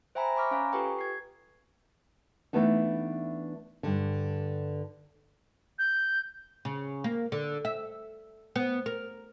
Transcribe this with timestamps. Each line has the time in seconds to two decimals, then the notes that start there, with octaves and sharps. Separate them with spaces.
0.15 C5 E5 G5 G#5 A#5 B5
0.36 B5 C#6 D6 F6 A#6
0.51 C#4 F5 G#5 A#5
0.72 F4 G4 A4 B4 G5 C#6
0.99 G#6 C7
2.53 E3 F3 A3 B3 D4 D#4
3.83 G2 D3
5.79 G6
6.65 C#3
7.04 A#3
7.32 D3
7.65 E5
8.56 B3
8.86 A#4